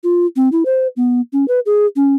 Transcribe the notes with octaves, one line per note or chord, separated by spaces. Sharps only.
F4
C4
E4
C5
B3
C#4
B4
G#4
C#4